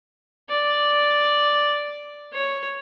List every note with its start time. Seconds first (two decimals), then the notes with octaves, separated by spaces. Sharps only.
0.49 D5
2.33 C#5